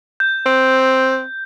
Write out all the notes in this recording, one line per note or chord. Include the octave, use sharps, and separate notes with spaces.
G6
C4